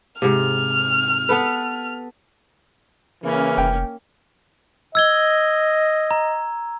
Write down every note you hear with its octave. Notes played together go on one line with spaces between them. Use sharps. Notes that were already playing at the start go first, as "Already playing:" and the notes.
G#2 C3 F6
B3 A4 B4
C#3 E3 A#3 C#4
F1 G5
D#5 E6 G#6 G7
A#5